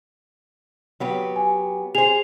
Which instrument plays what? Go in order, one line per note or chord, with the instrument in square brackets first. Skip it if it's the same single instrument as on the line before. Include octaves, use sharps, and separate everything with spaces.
[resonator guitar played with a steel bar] F#3 B3 G4
[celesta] G#5
[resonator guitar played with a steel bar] G#4 C5 [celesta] F7